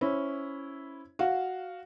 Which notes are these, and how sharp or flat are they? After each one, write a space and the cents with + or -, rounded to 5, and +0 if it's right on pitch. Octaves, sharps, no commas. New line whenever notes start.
C#4 +0 E4 -5 C5 +0
F#4 +0 F5 +0